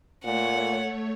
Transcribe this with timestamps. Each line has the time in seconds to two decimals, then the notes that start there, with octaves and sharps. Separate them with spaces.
0.25 A#2 A3 C#5 F#5